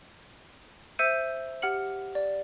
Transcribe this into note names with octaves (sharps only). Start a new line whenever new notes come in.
C5 E5 E6 G6 C#7 D#7
G4 F#5 F6 C#7 F#7
D5